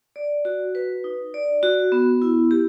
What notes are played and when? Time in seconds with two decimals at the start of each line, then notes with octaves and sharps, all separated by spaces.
0.16 D5
0.45 F#4
0.75 B4
1.04 D#4
1.34 D5
1.63 F#4
1.92 B3
2.22 E4
2.51 G4